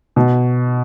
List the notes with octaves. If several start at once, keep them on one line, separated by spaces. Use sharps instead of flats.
B2